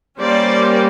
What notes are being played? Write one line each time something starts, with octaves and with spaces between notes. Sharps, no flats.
G3 A#3 C#4 C5 D5